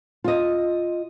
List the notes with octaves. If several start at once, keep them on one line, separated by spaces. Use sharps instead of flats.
F4 D#5